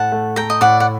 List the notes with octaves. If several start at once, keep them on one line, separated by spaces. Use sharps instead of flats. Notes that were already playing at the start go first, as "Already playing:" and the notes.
Already playing: A2 A3 F#5 A5
A3
A3 G5 A#5
D#5
A2 D5 F#5
F#5